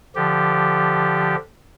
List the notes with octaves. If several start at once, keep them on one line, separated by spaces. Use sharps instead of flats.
D3 F3 G4